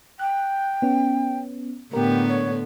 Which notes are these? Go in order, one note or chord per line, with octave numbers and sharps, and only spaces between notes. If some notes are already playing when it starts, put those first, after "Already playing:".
G5 F#6
B3 C#4
A2 D3 B3 G4 A#4
C#5